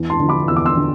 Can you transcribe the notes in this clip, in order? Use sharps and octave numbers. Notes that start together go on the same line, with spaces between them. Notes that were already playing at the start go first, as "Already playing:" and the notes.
Already playing: E2
A5 C6
D3 F3
B5 D6
E2 E6
D6
C6 E6
D3